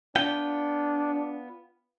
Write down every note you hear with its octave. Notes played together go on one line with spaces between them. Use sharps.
B3 D4 F4 G5